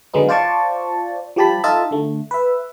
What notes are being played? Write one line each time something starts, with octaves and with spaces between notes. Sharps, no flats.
D3 F#3 G#3 B3 D#4
F4 C5 D5 A5 C#6
F3 G3 G4 A5 B5
D#4 F4 A4 D#5 E5 A5
D3 A3
B4 E5